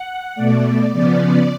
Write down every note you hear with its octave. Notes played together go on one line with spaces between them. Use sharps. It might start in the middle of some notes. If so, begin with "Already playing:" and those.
Already playing: F#5
B2 A3 D5
C#3 F3 B3 D5